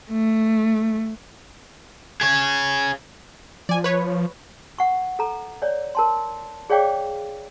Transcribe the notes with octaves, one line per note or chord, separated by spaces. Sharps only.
A3
G#4 C#5
F3 D5 G#5
B4 C#5
F#5 C#6
A4 A#5
C#5 D5
A#4 A5 C6
G#4 C#5 D5 F5 G5 D6